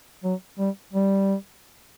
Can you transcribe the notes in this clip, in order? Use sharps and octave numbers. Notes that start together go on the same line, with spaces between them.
F#3
G3
G3